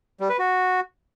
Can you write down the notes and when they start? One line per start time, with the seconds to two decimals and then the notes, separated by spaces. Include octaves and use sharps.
0.20 G3
0.30 B4
0.39 F#4